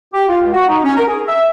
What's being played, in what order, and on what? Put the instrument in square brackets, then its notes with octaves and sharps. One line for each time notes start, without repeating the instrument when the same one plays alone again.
[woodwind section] G4
F4
C#2
F#4
D#4
C#4
A#4
G#4
E5